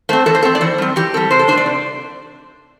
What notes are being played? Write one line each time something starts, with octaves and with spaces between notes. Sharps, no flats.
A3 C4 C5
E3 A4
C5
A3 C4 A4
D5
E3 C5
G3 C4
E3 G4
G3 C4 A4
C3 C5
A4
A3 D4 C5
D5
C3